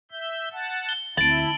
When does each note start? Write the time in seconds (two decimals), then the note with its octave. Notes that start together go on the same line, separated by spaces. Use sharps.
0.11 E5 G6
0.52 F#5 A5
0.89 G7
1.17 D2 C4 E4 A5 D7 F#7